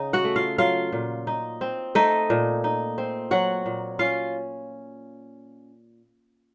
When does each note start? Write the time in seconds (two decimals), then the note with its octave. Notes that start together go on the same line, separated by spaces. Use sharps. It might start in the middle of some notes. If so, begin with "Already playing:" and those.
Already playing: C#3 D#4
0.13 F#4 F#5
0.24 A3
0.36 F4 F5
0.58 F#3 F4 F5
0.92 A#2
1.27 D#4
1.61 C4
1.95 A3 D#4 D#5
2.30 A#2
2.64 D#4
2.98 C4
3.31 F#3 F#4 F#5
3.66 A#2
3.99 C#4 F4 F5